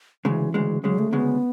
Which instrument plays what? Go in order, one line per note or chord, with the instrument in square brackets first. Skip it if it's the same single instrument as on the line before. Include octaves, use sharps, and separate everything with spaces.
[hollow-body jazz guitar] D2 C#3 G#3 [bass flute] E3
[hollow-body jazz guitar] D2 C#3 G#3
[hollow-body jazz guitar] D2 C#3 G#3 [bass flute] F#3
[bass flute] A3
[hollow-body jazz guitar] D2 C#3 G#3 [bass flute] B3